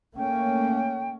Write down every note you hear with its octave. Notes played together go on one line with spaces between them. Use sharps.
A3 A#3 C#4 G5